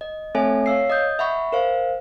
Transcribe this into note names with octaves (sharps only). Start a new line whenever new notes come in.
D#5
A3 C4 A4 C#5 E5 G#5
C#5 F5 E6 C7
D#5 D#6 G6
E5 F#5 B5 C#6
A#4 C5 F5